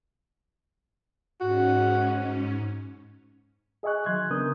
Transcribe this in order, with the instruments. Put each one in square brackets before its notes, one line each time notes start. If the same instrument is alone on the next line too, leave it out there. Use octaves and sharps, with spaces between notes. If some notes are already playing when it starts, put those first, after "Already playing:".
[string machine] G#2 C#4 [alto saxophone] F#4
[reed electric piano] G#4 D#5 E5 G#5 C#6 F#6
D#3 F#3 C6 F#6 G#6
C#3 B3 D4 A#4 D#6 G6